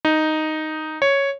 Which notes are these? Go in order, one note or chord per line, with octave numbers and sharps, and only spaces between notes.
D#4
C#5